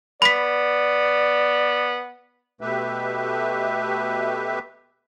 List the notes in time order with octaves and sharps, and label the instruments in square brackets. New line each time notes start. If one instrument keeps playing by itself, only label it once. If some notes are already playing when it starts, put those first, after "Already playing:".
[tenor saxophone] B3 [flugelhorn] D5 [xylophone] B5 B6
[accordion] B2 A3 G4 B4 E5